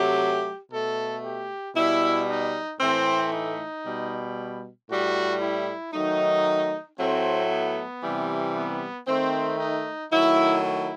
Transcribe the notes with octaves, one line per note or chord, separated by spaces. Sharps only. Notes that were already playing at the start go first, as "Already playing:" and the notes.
Already playing: C3 F#3 A3 G4
B2 A3 A4
G4
B2 G3 E4
D#4
A2 E3 A3 C4
D#4
B2 G3
A2 G3 F#4
E4
D#3 F#3 A3 D#4
A2 F#3 A3 C4
B3
C3 E3 G3
B3
D#3 A3 C4
D#4
D#3 F#3 A3 E4
E4